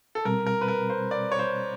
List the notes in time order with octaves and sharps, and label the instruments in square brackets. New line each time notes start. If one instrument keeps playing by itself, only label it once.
[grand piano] A4
[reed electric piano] B2 G3 C4 [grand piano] A#4
[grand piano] A#4
B4
A#4
C5
D5
C#5
C5